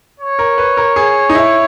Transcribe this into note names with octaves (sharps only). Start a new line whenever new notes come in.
C#5
A#4
B4
A#4
G#4
D#4
E4